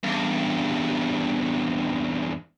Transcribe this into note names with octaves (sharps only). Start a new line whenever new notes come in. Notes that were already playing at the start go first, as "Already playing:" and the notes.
E2 G2